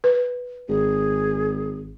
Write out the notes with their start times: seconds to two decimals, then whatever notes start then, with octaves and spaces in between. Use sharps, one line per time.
0.04 B4
0.69 G#1 G#4